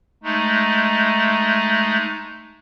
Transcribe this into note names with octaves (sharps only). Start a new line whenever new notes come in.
G#3 A3 D#4